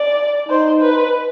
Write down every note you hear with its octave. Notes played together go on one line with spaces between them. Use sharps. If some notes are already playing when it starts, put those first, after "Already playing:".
Already playing: D5
D#4 C5
B4